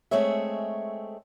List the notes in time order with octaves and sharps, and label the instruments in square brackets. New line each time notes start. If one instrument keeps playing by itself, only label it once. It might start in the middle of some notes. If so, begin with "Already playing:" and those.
[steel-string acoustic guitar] G#3 A3 C4 G#4 C#5 E5